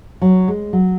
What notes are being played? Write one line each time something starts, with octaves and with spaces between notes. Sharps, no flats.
F#3
G#3
F#3